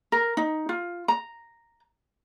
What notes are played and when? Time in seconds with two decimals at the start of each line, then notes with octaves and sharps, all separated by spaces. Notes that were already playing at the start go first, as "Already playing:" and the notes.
0.12 A#4
0.37 D#4
0.69 F4
1.08 A#5